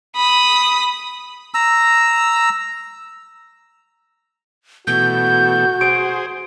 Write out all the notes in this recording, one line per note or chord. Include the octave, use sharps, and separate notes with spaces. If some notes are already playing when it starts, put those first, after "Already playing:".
B5 D#6
A#5 E6
B2 E3 A3 F#4 G6
G#4 C5 D7